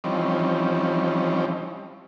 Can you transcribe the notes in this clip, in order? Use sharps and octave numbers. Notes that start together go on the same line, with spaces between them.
E3 F3 G3 C4 C#4 D#4